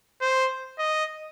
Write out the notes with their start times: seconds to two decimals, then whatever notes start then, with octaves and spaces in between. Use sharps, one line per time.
0.21 C5
0.79 D#5